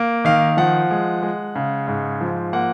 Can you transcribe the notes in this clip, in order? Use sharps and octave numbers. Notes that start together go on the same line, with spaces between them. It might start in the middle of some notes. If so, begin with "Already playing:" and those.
Already playing: A#3
D#3 F5
F3 F#5
G#3
G#3
C#3
G#2
F3
A#3 F#5